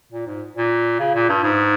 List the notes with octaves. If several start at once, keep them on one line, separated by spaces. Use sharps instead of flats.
A#2
G#2
A#2
C#3
A#2
G2
G#2